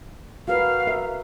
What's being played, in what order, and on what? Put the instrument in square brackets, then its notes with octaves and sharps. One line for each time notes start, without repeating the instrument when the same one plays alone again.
[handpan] F#4 A#4 B4 [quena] F5
[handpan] A#4 E5